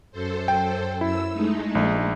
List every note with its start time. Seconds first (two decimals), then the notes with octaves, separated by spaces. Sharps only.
0.12 F#2 A4 C5
0.48 G5
1.01 F#2 E4 E6
1.32 G#3 A3 D#4
1.75 A#1